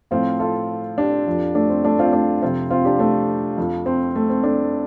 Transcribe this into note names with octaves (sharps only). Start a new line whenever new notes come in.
A2 F3 C4 F4
F4 A4
D4 G4
F2 F3
A3 D4
C4
A3 D4
C4 F4
A3 D4
F2 C3 F3 C4 F4
C4 F4
D4 G4
A3 D4
F2 F3
C4
A3
C4
A3 D4